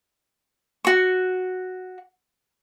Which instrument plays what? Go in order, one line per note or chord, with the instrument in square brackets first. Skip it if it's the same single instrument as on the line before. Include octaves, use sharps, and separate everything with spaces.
[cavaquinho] F#4 C#6